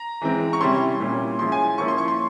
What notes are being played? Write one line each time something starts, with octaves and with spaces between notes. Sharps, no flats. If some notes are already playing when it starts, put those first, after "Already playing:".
Already playing: A#5
E3 G#3 C4
C#6
C3 G3 C#4 E4 C6
A#2 G3 C#4 E4
F3 G#3 C#4 E4 C6
G#5
F3 A#3 C#4 E4 C#6
C6
C#6
C6